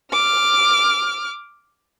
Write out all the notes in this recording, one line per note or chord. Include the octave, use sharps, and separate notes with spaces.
D6 F6